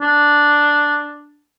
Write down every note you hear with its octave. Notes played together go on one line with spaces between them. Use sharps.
D4